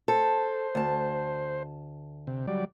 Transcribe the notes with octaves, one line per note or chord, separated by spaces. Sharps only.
A4 C5
D2 A5
C3
F#3 G3 D5